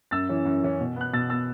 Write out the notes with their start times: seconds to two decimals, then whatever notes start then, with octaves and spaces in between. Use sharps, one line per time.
0.11 F#2 E6 A6
0.29 E3 C#4
0.45 F#2
0.63 E3 C#4
0.80 B2
0.96 B3 F#6
1.13 B2 E6 A6
1.30 B3 E6 A6